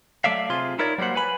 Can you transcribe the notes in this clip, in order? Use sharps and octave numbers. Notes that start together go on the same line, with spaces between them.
F#3 A3 D5 E5 F5
C3 F4 G#4 C6
D#4 E4 A#4 C#5 D5
F#3 G3 A#3 C5 F#5
B4 G#5 B5